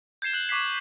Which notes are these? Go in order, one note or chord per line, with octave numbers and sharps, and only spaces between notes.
G6 G#6 C7 E7 G7
F#6 F#7
C#6 D6 F#6 B6 C7